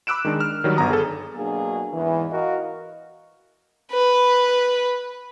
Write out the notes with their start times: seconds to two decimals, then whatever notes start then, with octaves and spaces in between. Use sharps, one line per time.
0.07 B5 D6 E6 F#6 D7 E7
0.25 D#3 G#3 D4 D#4
0.40 F6
0.64 D#3 F#3 G3
0.77 G1 B3 A#5 D#6
0.90 G#4 A4
1.35 B2 F#3 A#3 D4 G#4
1.93 E2 G#2 E3
2.31 F#4 A#4 D#5 F5
3.91 B4